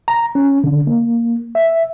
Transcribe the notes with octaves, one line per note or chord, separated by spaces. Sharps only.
A#5
C#4
D3
A#3
E5